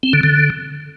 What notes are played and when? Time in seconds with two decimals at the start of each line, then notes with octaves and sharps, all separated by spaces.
0.03 C4
0.13 D3
0.23 D3